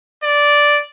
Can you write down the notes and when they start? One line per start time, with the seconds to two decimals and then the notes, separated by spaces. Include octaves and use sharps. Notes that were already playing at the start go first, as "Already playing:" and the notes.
0.24 D5